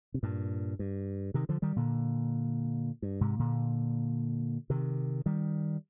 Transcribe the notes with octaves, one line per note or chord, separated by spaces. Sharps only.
C3
G2 A#2
G2
C3 D#3
D3 F3
D#3 G3
A#2 D3
G2
G#2 C3
A#2 D3
C3 D#3
D#3 G3